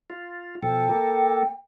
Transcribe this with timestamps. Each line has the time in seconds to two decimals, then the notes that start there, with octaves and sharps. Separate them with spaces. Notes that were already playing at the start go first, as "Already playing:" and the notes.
0.10 F4
0.63 B2 F3 A4 G5
0.89 A#3 A4